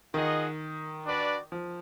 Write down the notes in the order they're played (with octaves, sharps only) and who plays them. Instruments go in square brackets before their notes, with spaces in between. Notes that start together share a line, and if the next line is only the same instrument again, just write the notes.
[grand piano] D#3 [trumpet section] F4 G#4 D#5 F#5
[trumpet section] D4 F#4 B4 D5
[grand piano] F3